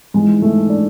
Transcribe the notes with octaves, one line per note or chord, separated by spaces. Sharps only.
G#2 E3 G#3
A3
D4